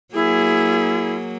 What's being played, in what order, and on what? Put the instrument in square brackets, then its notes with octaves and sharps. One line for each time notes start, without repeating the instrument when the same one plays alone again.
[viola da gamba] F#3 A#3 [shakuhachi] E4 [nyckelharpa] G#4